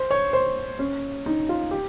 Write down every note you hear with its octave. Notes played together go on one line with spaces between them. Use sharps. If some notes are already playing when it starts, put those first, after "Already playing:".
Already playing: C5
C#5
C5
C#4
D#4
F4
G4